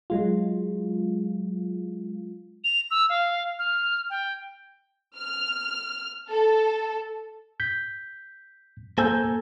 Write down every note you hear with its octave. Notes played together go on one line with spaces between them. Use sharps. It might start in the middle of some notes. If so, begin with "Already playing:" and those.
F#3 G#3 F4
F7
E6
F5
F6
G5
F6
A4
G6 B6
A#3 A4 C5 G#5 E6 G6